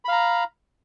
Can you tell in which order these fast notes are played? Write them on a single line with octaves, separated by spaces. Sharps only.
B5 F5 A#5